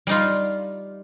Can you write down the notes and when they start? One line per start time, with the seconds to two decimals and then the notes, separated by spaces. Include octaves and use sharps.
0.07 G3 D#4 F4